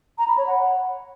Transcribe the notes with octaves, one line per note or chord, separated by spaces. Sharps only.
A#5
B5
C#5
F#5